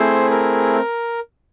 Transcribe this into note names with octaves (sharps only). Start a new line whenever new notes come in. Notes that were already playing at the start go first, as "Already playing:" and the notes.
Already playing: A3 C4 E4 G#4 C5
A#4